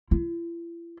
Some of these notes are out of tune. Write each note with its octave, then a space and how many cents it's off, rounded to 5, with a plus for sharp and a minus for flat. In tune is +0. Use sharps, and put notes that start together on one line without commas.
E4 +45